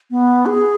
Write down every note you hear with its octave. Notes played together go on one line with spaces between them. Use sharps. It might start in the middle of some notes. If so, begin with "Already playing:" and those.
B3
G#4